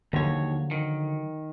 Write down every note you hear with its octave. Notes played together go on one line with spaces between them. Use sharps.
D#2 D3 F3 F#3 C#5
D#3